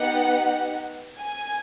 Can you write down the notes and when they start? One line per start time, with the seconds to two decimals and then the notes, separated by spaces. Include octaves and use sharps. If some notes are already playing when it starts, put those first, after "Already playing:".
Already playing: B3 D#4 G4 F#5
1.20 G#5